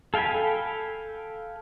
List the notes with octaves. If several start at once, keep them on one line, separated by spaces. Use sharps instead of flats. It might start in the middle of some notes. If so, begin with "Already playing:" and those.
A4 F5 G5 G#5 B5